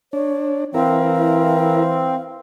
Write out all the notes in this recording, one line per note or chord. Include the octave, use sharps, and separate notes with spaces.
D4 C#5
E3 C4 E4 A#4 F5